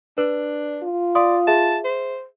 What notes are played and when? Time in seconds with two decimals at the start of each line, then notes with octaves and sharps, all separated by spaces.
0.18 D4 B4
0.83 F4
1.15 D5 F5 C6 D#6
1.47 G#4 E5 A5
1.84 C5